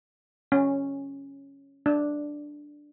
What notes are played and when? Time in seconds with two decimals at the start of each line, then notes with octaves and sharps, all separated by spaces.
0.52 C#4
1.86 D4